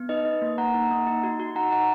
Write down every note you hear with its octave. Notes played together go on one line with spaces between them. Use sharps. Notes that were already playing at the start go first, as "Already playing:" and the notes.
Already playing: B3
D#4 B4 D#5
D#4
A#3
A#3 F#5 A#5
D#4
A#3
D#4
F#4
F#4
D#4 F#5 A#5
D#4 F#5 A#5